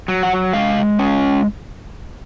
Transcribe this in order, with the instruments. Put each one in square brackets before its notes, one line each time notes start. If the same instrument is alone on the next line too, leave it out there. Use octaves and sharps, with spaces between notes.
[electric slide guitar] F#3
F#5
G#3 F5
C#4